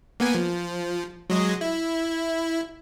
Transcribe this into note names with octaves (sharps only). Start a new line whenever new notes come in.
A#3 B3 G#5
F3
F#3 G#3 D#5
E4